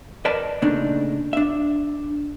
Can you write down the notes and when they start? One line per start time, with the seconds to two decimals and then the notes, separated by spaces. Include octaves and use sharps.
0.25 A#4 B4 D5 D#5 A5
0.62 A#2 C#3 A3 D4 D#4
1.33 D4 E5